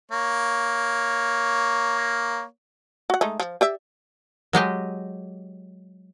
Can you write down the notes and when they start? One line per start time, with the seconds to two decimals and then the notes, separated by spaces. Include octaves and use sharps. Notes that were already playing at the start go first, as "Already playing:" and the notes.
0.11 A#3 C#5
3.10 F#4 F#5
3.21 G#3 A3 D#4
3.40 F3
3.61 G4 D5 E5
4.53 F#3 G#3 G4 D#5